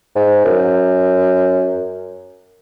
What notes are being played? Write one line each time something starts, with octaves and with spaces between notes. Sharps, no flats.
G#2
F#2